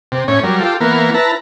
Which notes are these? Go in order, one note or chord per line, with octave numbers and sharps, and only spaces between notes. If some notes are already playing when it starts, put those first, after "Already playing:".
C3
A2 C#4 C#5
F#3 G3 A#4
F4 G4 A4
E3 A#3 B3 A#4
E4 B4 A5 A#5